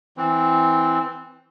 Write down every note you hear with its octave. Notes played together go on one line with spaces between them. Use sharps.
E3 C4